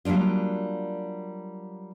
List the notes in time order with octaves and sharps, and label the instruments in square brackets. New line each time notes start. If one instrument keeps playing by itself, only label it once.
[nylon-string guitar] F#3 G3 A#3 D4 F4